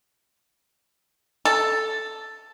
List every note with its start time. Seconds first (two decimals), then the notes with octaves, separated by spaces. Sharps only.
1.45 A4